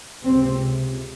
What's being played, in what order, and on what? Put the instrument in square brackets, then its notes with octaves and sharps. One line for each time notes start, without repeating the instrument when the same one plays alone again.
[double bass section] C#2 C3 C4